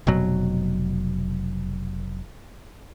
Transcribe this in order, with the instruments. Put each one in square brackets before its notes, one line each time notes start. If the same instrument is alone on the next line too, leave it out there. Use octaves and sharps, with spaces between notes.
[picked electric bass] F1 B2 F#3